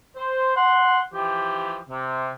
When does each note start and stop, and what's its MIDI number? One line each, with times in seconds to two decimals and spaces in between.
0.16 0.55 72
0.56 1.01 78
0.56 1.01 84
1.13 1.77 52
1.13 1.77 53
1.13 1.77 67
1.89 2.29 48